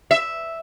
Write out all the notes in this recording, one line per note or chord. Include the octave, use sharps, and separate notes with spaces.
E5